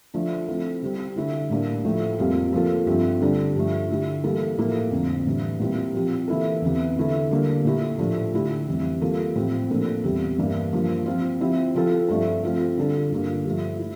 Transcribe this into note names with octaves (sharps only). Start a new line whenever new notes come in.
F3 A3 D4
F3 C4 E4 A4
C3 G3 C4
D3 A3 E4 A4
A2 G3 A#3 D4
A2 F3 A3 E4 A4
F2 C3 G3 A#3 F4
F3 A#3 F4 A4
G2 F3 A3 C4
D3 G3 D4 A4
G2 F3 A3
D3 A3 E4 G4
E3 G3 A#3 E4 A4
A2 F3 A#3 E4 A4
F2 D3 F3 C4
A2 E3 G3 D4
A#2 G3 C4 E4
F3 C4 G4
E3 A#3 E4 A4
E2 C3 E3
D3 A3 E4 A4
D3 G3 A#3
A#2 A3 E4 G4
A2 F3 A3 D4 G4
D3 A3 E4 G4
F2 E3 G3
E3 G3 A#3 F4 A4
A2 F3 C4 G4
A#2 F3 A#3 D4 A4
E2 C3 E3 G3
G2 E3 A#3 D4
G2 F3 A#3
F3 C4 F4
F3 C4 E4 G4
C3 F3 C4 F4 A4
G2 F3 A3 D4 A4
F3 C4 F4 A4
D3 G3 D4 F4 A4
G2 D3 G3 A#3 F4
G2 F3 A3
E4